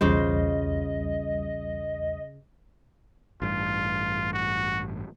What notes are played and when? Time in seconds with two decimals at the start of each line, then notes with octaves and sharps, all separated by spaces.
0.01 B1 E2 C#3 G3 F4 C5 D#5
3.42 A1 G2 F4
4.33 F#4